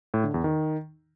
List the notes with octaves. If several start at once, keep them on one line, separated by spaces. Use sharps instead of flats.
A2
D3
E2
D#3